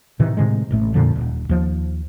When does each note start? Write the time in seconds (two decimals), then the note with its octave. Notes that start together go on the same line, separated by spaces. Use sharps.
0.19 A2 C3 D#3 E3
0.37 A2 C3 D#3 G#3
0.71 A1 A2 A3
0.94 F2 A#2 D3 F3
1.16 D#1
1.49 D#2 F3